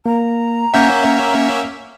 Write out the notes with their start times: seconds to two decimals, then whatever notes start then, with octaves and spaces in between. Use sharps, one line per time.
0.06 A#3 A#5
0.74 A#3 C#4 E5 F#5 G6